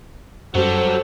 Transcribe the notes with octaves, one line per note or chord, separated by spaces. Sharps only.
F#2 F#3 G3 A4 C5